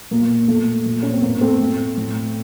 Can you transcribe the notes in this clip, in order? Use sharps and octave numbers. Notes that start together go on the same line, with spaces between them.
A#2 A#3
A#2 A3
A#2
C#4
C4
A2 A#3
A3 C4
A2
A2